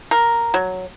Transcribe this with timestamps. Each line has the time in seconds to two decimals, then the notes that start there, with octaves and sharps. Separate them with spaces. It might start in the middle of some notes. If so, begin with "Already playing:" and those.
0.11 A#4
0.54 F#3